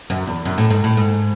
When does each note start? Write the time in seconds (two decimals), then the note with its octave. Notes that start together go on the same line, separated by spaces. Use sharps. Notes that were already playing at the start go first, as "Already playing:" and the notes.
0.10 F#2
0.27 E2
0.45 F#2
0.58 A2
0.70 G#2
0.84 A2
0.97 G#2